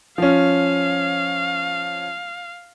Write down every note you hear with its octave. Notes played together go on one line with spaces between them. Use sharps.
F3 C#4 F5